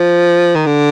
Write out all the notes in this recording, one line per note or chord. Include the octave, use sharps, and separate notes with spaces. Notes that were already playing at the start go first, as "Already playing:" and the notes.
Already playing: F3
D#3
D3